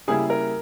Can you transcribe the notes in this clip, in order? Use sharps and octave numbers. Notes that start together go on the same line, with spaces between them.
C#3 G3 A#3 E4 G#4
A#4